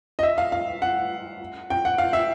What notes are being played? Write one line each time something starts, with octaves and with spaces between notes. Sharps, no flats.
D#5
E5
F5
F5
F#5
G5
F#5
F5
E5